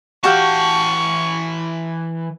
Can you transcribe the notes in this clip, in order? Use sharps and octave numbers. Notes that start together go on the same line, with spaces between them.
E3 F#4 G4 F5 A5 C#6